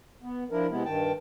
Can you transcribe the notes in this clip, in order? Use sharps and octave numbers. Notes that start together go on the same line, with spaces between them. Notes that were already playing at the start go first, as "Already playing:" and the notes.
B3
F3 D4 E4 A#4
C3 G#3 B3 E4
G2 D#3 G5 A5